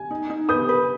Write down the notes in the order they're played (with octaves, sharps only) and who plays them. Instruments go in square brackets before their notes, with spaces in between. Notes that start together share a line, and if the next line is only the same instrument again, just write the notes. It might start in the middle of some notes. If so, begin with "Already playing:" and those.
Already playing: [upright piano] G#5
[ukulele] D#4
D#4
[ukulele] B4 [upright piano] D#6 G6
[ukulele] B4